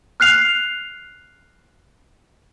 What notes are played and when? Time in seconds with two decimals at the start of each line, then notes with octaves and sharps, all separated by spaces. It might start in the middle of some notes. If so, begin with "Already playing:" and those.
0.20 F6 F#6 C7 F7